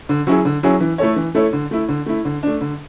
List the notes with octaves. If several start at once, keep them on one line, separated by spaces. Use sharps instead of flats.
D3
F#3 C#4 E4 G#4
D3
F#3 C#4 E4 G#4
E3
A3 E4 A4 C#5
E3
A3 E4 A4 C#5
D3
A3 E4
D3
A3 E4
D3
A3 D4
D3